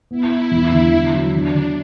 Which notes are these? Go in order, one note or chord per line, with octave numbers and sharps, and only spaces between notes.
B3 E4
B3
E2
D3
E2
F#3
D3 D4
D3